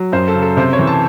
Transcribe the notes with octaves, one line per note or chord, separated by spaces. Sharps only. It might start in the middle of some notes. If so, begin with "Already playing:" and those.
Already playing: F#3
F#2 C5
A4
C#3
A4
C3 C5
C#5
E3
A5